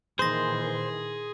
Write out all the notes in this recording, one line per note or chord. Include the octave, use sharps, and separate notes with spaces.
A#2 D#3 E3 G#4 C5 C6 D#6 A#6